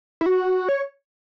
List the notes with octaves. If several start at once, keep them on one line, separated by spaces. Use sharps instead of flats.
E4
F#4
C#5